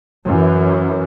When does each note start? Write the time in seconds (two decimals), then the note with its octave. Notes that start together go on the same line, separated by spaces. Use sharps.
0.25 F#2 E3